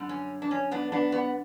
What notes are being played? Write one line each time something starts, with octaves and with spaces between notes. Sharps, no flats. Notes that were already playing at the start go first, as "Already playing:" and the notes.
Already playing: F#2 D3 G3
C#4
D4
C#4
B3 D4
B3 D4
B3